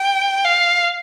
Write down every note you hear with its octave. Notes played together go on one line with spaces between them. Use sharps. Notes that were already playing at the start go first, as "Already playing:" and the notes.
Already playing: G5
F5